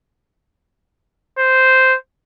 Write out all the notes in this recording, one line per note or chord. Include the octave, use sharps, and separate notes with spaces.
C5